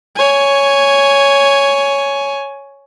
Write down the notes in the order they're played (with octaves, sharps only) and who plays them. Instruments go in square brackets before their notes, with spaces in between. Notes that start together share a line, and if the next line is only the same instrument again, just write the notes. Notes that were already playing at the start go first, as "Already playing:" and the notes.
[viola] C#5 G#5